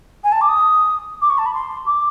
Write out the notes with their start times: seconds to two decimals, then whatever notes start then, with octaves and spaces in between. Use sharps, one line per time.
0.23 G#5
0.32 A5
0.41 D6
0.48 D#6
1.21 D6
1.29 C#6
1.38 A5
1.45 B5
1.54 C6
1.86 D6